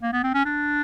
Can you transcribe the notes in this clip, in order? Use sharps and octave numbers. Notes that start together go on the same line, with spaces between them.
A#3
B3
C4
C#4
D4